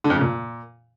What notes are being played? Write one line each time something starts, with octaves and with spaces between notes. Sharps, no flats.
D3
F2
C#3
A#2